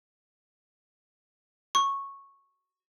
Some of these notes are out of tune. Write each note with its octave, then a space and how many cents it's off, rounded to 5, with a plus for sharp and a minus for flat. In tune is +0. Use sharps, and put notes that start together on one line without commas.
C#6 -10